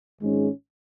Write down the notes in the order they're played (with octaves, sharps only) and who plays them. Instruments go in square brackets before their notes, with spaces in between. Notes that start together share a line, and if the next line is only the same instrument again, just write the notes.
[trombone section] G#1 G#2 G#3 C#4